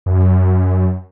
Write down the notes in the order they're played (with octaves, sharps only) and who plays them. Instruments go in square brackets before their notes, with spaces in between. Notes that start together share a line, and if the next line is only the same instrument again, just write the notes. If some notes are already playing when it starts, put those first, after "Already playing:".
[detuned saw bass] F#2